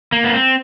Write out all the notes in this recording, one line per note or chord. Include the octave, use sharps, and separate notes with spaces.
A#3
B3
C4